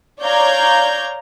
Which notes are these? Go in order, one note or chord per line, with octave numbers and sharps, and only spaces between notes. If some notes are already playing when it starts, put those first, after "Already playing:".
C#5 D5 F5 A#5 G6 G#6